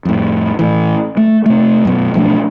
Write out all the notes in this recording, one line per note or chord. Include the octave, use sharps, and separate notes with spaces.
F2 A2
A2 E3
A3
C3 A3
F#2 B2
B1 F3 A3 D4